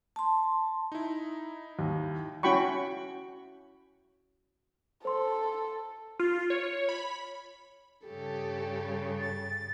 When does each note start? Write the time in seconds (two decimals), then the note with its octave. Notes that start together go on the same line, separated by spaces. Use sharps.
0.16 A5 C6
0.92 D#4 E4
1.79 D#2
2.43 C#4 E4 F#4 G5 B5 C#6
5.05 A4 C5 C6
6.19 F4
6.50 C#5
6.89 B5
8.06 G2 C#3 G4 A4
9.19 A6